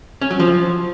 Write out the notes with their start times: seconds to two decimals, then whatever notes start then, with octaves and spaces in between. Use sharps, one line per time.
0.21 C#4
0.31 F#3
0.40 F3